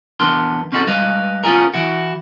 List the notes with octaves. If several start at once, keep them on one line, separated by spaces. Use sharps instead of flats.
E2 B3 D4 A#4 C6
C4 C#4 D#4 F#4 G4 A4
G3 G#3 B4 D#5 F5
B3 C#4 F4 G4 G#4 A#4
E3 E4 F#4